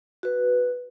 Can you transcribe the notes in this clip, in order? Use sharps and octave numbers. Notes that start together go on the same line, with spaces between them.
F#4 B4